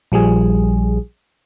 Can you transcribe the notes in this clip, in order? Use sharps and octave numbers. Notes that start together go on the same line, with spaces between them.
A#1 F3 G3 G#4